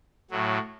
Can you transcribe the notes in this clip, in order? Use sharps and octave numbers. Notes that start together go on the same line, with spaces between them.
A2 F#3